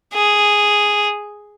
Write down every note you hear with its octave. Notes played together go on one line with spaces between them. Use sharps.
G#4